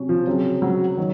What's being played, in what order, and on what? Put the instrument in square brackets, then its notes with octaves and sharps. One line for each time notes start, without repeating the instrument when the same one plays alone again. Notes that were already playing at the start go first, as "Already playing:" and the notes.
Already playing: [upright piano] C3 F#3 C#4
[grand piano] F3
[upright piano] C#3 F#3 C4
[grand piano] F#3
[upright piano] D#3 F#3